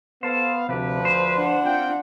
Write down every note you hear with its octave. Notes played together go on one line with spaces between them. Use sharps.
B3 A4 C5 F5
D2 C3 F3 G4 B4
C5
D4 F#5
C4 F4 G5